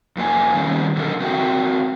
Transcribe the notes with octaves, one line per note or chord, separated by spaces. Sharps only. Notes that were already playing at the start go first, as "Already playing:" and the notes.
F2 A#3 E4 G#5
D#3 G3 A3 C4 C#4
D3 E3 F#4 A4 A#4
C4 F#4 A#4 C5 E5 G5